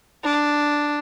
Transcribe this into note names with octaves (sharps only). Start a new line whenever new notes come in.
D4